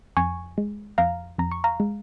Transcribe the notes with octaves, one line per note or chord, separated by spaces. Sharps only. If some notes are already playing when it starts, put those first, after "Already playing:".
F2 G#5 C#6
G#3
F2 F5 A#5
F2 A#5
C#6
F5 A#5
G#3